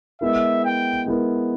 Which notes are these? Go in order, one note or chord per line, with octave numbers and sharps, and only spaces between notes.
G#3 B3 E4 A#4 E5
G5
G#3 B3 E4 A#4